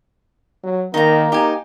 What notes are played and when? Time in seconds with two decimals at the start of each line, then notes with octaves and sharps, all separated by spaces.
0.64 F#3
0.94 D#3 A#3 D#4 A#5
1.32 D#4 G4 G#5